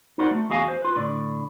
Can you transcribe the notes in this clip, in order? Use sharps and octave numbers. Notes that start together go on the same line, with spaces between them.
D#4 F#4 A#4 C5 D5 F#5
A3
E2 F#4 G#4 D#5 F5 G#5
C5
F4 B4
A2 D3 D5